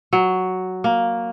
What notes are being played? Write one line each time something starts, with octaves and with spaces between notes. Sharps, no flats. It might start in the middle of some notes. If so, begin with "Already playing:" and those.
F#3
A#3